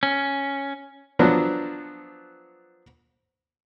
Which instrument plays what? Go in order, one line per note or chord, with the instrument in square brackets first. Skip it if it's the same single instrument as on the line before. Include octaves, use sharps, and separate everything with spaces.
[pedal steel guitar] C#4
[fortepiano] F3 F#3 B3 D4